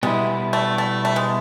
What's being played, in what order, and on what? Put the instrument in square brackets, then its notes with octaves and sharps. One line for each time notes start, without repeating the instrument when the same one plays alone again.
[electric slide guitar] B2 G3 B3 E4 [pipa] G#3
[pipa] A3
A3
A3
G#3